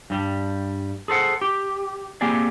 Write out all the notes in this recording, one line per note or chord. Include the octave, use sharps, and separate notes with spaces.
G2 G3
G#4 A4 C5 F#5
G4
A#3 C4 G4 G#4 D5